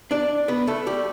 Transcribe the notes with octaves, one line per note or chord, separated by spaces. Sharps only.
D4 D5
B3 B4
A3 A4
G3 G4